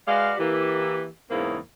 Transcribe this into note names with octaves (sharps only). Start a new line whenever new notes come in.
G#3 F#4 B4 D5 F5
E3 A#3 G4
E2 G#2 C#3 A#3 C4 E4